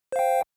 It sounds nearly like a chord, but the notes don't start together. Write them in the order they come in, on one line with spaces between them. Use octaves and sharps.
C5 F5 G5